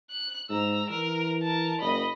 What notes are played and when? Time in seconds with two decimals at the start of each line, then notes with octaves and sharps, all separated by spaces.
0.11 F#6
0.50 G#2 A#5 E6
0.90 E3 A#4
1.42 A#4 A5
1.81 F#1 D#5 B5